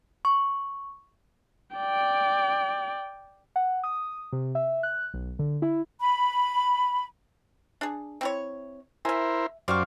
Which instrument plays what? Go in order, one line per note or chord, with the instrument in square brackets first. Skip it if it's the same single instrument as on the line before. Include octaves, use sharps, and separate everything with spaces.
[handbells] C#6
[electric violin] D5 G5
[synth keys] F#5
D#6
C3
E5
F#6
B1
D3
E4
[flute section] B5
[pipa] D4 G#4
C4 E4 C#5
[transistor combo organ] E4 A#4 C5 [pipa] E5 G#5
[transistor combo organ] F#2 C5 D5 [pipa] G3 F5 C#6